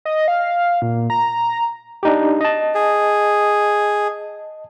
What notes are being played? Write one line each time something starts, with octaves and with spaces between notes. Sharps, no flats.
D#5
F5
A#2
A#5
D4 D#4 G4
D#5 A5
G#4